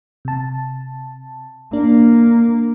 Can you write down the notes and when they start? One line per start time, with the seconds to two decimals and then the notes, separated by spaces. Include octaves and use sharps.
0.25 C3 A5
1.73 A#3 D4